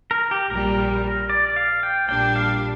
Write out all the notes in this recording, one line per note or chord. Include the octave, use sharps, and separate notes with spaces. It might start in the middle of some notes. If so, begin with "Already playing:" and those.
A#4
G4
A#1 A#2 G3 A#4
D5
F5
G5
A#1 A#2 G3 D4 G5
F5